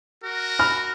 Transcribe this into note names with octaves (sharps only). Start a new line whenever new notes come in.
F#4 A#4
B5 F6